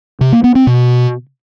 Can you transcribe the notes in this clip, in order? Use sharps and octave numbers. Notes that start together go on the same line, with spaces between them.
C3
A#3
B3
C4
B2